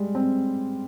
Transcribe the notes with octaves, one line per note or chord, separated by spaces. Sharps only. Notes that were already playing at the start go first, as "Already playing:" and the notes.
Already playing: G3 G#3
C4